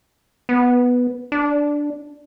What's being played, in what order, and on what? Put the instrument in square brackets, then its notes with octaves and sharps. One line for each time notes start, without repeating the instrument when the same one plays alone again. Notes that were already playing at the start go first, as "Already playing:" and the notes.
[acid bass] B3
D4